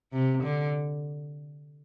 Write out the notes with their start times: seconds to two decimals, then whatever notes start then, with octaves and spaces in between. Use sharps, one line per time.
0.13 C3
0.44 D3